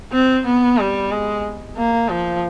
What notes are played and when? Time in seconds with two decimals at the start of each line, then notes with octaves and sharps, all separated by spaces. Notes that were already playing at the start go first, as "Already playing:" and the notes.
0.12 C4
0.46 B3
0.78 G3
1.11 G#3
1.77 A#3
2.10 F3